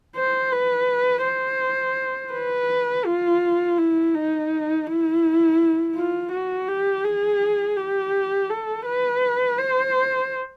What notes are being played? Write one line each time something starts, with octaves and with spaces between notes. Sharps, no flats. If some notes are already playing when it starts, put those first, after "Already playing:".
C5
B4
C5
B4
F4
E4
D#4
E4
F4
F#4
G4
G#4
G4
A4
B4
C5